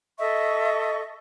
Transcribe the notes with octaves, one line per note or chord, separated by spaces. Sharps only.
A4 D#5 E5 C#6